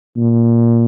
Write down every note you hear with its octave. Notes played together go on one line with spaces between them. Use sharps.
A#2